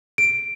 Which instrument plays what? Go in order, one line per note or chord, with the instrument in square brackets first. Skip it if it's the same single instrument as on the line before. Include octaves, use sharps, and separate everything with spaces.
[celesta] D7